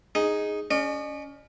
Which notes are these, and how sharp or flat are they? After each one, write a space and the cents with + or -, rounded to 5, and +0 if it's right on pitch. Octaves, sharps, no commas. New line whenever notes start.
D#4 +0 G#4 +0
C#4 +25 D#5 -45